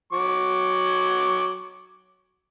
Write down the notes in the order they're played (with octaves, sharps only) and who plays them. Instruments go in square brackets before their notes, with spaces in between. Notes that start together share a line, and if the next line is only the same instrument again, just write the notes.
[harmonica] F#3 C#6 D6